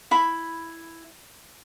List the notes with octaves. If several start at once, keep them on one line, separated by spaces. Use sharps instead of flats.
E4 B5